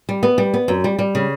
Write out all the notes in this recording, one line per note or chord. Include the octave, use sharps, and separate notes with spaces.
G3
B3
G3
B3
F#2
G3
G3
C#3